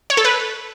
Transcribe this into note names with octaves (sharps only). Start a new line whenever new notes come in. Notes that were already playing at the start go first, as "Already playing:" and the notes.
C#5
A4
B4